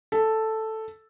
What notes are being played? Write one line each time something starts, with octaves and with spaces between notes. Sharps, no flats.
A4